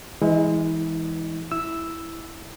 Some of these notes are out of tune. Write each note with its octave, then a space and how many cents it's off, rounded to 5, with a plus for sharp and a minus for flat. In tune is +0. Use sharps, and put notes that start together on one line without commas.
E3 +0 G#3 -10 E4 -40
E4 +0 E6 +0